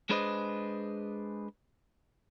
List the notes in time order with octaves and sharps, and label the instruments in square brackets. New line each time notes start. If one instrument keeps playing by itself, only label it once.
[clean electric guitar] G#3 D4 G#4 B4 C5 D#5